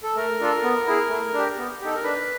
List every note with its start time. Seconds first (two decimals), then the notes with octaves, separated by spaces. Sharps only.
0.03 A4
0.16 A3 A#4
0.40 D4 F4 A4
0.63 B3
0.87 E4 G#4
1.10 A3
1.33 D4 G4
1.58 B3
1.81 D#4 G4 A4
1.95 A#4
2.04 D4 B4